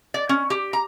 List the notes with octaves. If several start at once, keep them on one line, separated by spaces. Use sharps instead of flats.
D5
C#4
G4
A#5